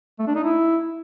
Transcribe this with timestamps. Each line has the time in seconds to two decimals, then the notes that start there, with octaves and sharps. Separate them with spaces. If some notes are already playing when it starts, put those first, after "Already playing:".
0.19 A3
0.27 D4
0.36 D#4
0.44 E4